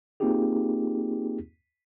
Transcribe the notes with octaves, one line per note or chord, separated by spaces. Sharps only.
A#3 C4 D#4 F4 G4 G#4